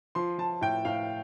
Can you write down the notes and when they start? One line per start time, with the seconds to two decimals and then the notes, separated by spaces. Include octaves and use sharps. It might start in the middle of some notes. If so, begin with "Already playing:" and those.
0.15 F3 C6
0.38 F3 A5
0.61 A2 G5
0.85 A2 F5